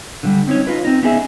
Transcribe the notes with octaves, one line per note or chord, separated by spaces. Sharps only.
D3 F3 G3
C4 C#4 D#4 C#5
D#4 F4 B4
C4 D#4
B3 C#4 D#4 G#4 A4 E5